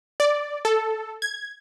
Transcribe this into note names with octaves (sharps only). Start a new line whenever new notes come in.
D5
A4
G#6